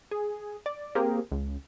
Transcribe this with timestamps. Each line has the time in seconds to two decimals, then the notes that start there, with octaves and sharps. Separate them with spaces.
0.11 G#4
0.66 D5
0.95 A#3 C4 G4 G#4 A#4
1.32 C#2